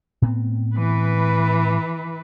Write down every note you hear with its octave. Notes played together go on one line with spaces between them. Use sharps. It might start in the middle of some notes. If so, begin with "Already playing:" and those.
A2 B3 C4
E3 B4